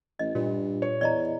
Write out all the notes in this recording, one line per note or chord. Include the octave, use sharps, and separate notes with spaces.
A1 D#5
G2 A#2
C#5
E2 D5 D#5 A#5